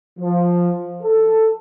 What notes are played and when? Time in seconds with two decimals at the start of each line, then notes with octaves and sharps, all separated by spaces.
0.19 F3
1.02 A4